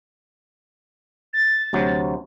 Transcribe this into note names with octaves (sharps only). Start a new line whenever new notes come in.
A6
D2 C3 F#3